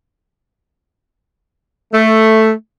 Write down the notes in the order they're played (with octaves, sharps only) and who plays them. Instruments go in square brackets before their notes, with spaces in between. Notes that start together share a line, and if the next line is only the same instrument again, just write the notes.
[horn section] A3